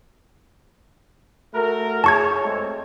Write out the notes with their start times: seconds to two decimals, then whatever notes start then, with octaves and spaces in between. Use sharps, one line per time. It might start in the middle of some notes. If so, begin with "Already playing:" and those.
1.54 A3 F#4 A#4
2.04 G#4 C#5 A5 C#6 G#6
2.44 G#3 A3 C4